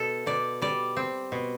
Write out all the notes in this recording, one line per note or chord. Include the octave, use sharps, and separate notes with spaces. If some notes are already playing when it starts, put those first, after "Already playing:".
Already playing: B2 A4
B2 D5
G3 D5
C4
B2